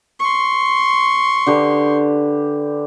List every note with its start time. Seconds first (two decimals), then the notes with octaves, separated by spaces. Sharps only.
0.20 C6 C#6
1.47 D3 G4 B4